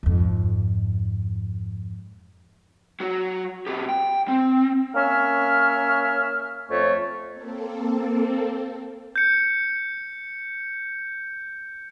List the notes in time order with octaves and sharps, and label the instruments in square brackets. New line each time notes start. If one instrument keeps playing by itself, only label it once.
[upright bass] F2 G#2
[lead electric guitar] F#3 F#4
B2 G4
G5
C4
[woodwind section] A#3 C#4 C#5 E5 F6
F2 A3 C#5
[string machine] A#3 C4 A4
[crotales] G6 C#7